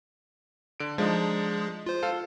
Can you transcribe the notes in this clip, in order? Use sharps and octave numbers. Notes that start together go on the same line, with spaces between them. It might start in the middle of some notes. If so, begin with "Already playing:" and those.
D3 D7
F3 G#3 D4 D#4 G#4
F4 C5
A4 F5